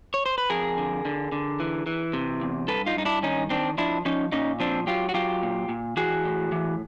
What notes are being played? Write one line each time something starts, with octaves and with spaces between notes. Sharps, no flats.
C#5
C5
B4
F2 G#4 A#4
D3
D3
D3
E3
E3
C3
E2
G2 A4 B4
D#4 F4
G2 D#4
D4 E4
D#3 C#4 D#4
D#3 C4 D4
F3 D4 E4
F3 C#4 D#4
A#2 C#4 D#4
F3 C4 D4
F#3 F4 G4
F#4
F#3 F4 G4
A#2
A#2
E3 F#4 G#4
A2
E3